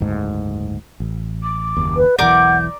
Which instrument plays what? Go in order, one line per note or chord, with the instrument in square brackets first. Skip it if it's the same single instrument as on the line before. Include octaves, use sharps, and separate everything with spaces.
[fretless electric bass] F#1 D2 G#2
A1
[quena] D6
[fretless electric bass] F#1 D#2
[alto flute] B4
[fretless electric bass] E1 B1 E3 [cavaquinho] A#4 D5 D6 [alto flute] F#5 [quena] G6